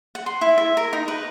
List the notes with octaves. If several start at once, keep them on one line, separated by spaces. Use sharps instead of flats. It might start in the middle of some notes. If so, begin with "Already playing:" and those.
F#5
C6
E4
E5
A#4
D#4
B4